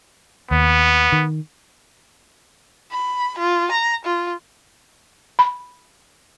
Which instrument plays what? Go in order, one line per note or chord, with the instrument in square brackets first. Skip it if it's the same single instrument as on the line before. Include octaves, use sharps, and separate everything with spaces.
[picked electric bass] D#2 [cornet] B3
[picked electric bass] D#3
[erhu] B5
F4
A#5
F4
[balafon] B5